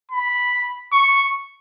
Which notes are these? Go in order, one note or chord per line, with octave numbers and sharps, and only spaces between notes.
B5
C#6